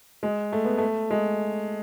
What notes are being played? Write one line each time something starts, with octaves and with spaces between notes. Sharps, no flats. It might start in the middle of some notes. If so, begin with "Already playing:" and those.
G#3
A3
B3
A3
G#3